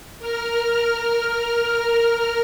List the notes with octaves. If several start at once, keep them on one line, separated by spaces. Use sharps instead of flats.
A#4 F6